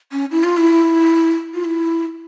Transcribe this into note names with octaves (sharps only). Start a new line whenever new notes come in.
C#4
E4
F4
E4
F4
E4